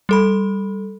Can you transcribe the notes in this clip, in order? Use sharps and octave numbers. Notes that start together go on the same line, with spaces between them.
G3 A4 B5